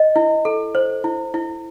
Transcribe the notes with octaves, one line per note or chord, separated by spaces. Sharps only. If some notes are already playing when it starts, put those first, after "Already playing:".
Already playing: D#5
E4
A4
C5
E4
E4